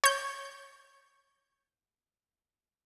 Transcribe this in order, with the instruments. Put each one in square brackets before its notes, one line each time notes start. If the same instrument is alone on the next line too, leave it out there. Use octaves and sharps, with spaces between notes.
[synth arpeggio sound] C#5 G6